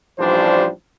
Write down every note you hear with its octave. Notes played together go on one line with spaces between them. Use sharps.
A1 F3 G3 D4 C5